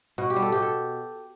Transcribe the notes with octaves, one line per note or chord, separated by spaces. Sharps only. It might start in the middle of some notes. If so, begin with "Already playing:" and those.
B2 F#4
G4
G3
A4
B2 G4
A4